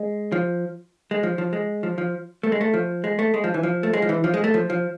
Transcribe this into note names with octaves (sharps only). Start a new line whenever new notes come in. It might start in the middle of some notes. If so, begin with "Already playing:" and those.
Already playing: G#3
F3
G#3
F3
F3
G#3
F3
F3
A3
G#3
A3
F3
G#3
A3
G#3
F3
E3
F3
A3
G#3
F3
E3
F3
G#3
A3
F3
F3